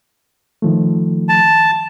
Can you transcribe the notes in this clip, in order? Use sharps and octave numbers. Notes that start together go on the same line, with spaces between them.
D#3 F3 A3
A5